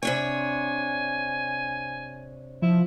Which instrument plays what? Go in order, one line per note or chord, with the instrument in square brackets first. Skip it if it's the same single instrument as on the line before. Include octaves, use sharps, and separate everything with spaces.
[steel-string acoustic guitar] C3 D4 C#5 [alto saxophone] G#5
[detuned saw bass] F3 [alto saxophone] E4